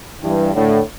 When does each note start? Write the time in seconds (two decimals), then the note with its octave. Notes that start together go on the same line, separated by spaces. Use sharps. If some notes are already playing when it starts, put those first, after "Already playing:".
0.23 G2 E3
0.54 A2 D3